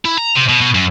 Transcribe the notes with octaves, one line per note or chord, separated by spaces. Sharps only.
E4
A#5
C3
B2
B2
F#2